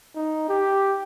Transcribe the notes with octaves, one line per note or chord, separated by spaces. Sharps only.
D#4
G4